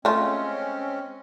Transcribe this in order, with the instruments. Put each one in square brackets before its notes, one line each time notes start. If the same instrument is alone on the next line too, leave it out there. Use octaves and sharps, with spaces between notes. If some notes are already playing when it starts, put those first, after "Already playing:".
[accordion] G#3 C4 C#4 [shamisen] A3 F4